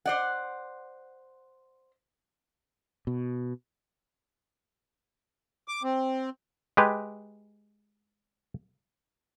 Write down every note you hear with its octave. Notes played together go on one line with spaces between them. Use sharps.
C5 D5 F#5
B2
D6
C4
G#3 G4 B4